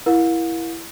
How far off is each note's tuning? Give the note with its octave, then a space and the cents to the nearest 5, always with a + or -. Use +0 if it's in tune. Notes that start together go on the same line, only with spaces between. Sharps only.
E4 +10 A#4 +25 F5 +45